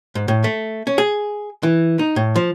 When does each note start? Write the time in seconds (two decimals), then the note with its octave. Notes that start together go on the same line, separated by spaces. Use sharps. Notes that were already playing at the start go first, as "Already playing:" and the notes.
0.15 G#2
0.28 A2
0.44 A3
0.87 C#4
0.98 G#4
1.63 E3
1.99 D#4
2.16 A2
2.36 F3